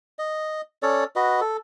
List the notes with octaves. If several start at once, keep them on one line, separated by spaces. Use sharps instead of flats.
D#5
C#4 A4 C#5 D5
F#4 B4 D#5
A4